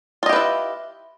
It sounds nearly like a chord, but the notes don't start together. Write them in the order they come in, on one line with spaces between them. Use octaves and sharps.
F4 D#5 G4 B4 E4